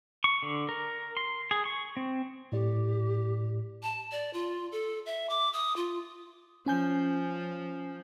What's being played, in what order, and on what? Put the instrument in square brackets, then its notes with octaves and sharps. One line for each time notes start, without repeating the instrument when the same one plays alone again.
[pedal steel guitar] C#6
D3
A#4
C6
G#4
C#6
C4
[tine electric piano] A2 D5 [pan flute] G4
[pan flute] A5
D5
F4
A4
E5
D6
D#6
F4
[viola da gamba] F3 [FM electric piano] C#4 G#5 G6